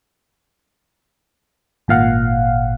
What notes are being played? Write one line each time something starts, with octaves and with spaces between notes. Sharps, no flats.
G#1 A#2 F5 F#5